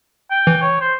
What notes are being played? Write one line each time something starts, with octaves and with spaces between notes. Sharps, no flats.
G5
E3
C#5
C5